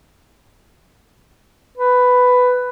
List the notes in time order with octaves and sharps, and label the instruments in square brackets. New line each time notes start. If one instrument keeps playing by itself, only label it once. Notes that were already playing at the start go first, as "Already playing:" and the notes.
[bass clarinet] B4